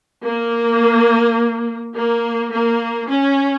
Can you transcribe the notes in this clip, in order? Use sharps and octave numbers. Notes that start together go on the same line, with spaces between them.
A#3
A#3
A#3
C#4